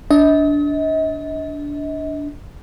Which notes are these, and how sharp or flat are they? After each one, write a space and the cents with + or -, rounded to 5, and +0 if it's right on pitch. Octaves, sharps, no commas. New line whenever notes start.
D4 -15 D#5 +40